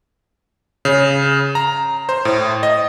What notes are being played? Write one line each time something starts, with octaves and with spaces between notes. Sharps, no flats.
C#3
A#5
C5
A2
D#5